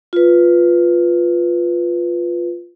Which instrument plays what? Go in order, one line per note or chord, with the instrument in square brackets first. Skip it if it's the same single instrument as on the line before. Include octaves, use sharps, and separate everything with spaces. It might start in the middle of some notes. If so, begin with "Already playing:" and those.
[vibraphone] F4 B4